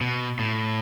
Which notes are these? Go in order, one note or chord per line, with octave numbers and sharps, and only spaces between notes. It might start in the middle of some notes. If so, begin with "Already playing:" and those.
B2
A2